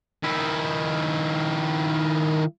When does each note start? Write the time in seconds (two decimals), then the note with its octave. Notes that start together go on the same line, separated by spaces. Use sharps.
0.23 D#3 E4